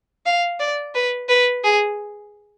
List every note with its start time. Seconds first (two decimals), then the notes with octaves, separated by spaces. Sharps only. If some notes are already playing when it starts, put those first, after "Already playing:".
0.26 F5
0.60 D5
0.95 B4
1.29 B4
1.64 G#4